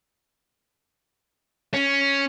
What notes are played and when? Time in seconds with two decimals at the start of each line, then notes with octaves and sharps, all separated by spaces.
1.74 C#4